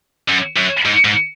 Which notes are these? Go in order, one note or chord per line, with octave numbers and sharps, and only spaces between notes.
F#2
F#2
G#2
G#2